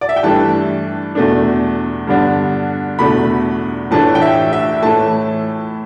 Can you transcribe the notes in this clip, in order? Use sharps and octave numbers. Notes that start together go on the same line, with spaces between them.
D5
E5
G5
G2 E3 A3 D4 A5
E2 B2 A3 D4
G2 D3 B3 D4
E2 B2 A3 D4 B5
A2 E3 A3 D4 A5
G5
E5
E5
A2 E3 A3 A5